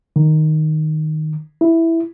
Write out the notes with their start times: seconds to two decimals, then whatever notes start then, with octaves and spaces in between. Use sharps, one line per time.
0.16 D#3
1.61 E4